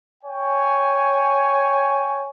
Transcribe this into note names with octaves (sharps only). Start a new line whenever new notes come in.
C#5 G5 G#5